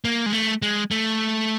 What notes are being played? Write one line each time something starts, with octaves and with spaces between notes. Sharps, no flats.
A#3
G#3
A3
G#3
A3